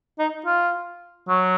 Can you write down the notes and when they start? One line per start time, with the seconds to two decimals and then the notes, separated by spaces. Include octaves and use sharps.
0.19 D#4
0.46 F4
1.28 F#3